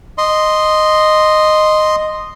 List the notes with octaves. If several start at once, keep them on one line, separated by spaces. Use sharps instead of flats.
D#5 C6